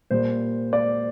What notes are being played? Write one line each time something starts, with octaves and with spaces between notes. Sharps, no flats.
A#2 G3 A#3 C5
D5